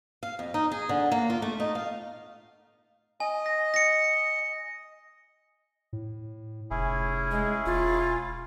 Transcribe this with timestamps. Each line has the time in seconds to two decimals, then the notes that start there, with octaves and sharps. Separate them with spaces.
0.23 F5
0.39 F2
0.54 D#4
0.72 G#4
0.89 D3
1.12 A#3
1.30 F4
1.42 A3
1.60 D#4
1.75 F5
3.20 D#5 G#5
3.46 A#6
3.74 A#6 C#7
5.93 A2
6.71 F1 C#4 E4 G#4
7.31 G#3
7.66 E1 F4